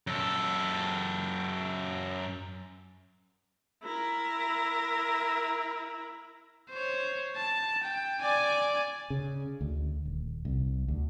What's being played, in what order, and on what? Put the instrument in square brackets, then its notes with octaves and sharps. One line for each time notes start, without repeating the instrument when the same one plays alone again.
[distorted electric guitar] F#2 A4
[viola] E4 A#4
[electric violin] C5 C#5
A5
G5
D5 G#5
[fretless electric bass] C#3
D2
D#1
C2
D2